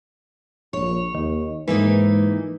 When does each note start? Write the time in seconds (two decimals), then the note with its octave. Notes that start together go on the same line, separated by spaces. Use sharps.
0.73 A#1 C#5
1.15 D#2 D#3
1.68 G#2 E3 A#3 D#4 B4